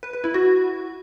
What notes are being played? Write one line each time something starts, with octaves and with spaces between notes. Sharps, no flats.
B4
B4
E4
F#4